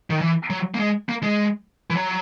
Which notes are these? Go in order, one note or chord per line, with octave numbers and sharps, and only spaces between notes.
D#3
E3
F#3
A#3
G#3
A#3
G#3
E3
F#3